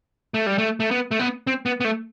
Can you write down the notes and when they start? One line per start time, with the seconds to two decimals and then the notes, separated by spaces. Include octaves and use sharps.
0.34 A3
0.46 G3
0.58 A3
0.80 A3
0.91 B3
1.11 A3
1.19 B3
1.47 C4
1.66 B3
1.80 B3
1.85 A3